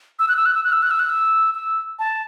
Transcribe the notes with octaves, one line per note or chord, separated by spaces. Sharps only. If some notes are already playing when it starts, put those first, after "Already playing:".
E6
F#6
E6
F#6
E6
F#6
E6
F#6
E6
F#6
E6
E6
A5